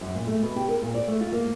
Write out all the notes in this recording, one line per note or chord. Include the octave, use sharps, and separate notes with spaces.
F#2
A#2
A3
B2
G4
A#4
A#2
D5
A3
F4
A#3